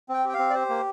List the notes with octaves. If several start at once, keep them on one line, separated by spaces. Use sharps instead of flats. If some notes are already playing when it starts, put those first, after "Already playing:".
C4 G5
G4 G5
C4 F5
D5
G4 C5
A#3